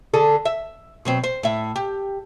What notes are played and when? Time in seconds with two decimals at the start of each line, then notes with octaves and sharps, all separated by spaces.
0.14 D3 G#4 A4
0.45 E5
1.05 B2 F#3 C4
1.24 C5
1.43 A2 E5
1.76 G4